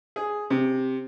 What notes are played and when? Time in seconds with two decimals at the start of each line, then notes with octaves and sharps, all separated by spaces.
0.16 G#4
0.50 C3